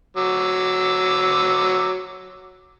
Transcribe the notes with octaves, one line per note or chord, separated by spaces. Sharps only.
F#3 D6 E6